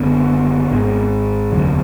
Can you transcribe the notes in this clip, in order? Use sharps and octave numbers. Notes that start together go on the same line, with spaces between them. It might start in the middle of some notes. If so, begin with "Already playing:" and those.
Already playing: F#1 D3 B3
G#1 G#2
F1 D#2 D3 F#3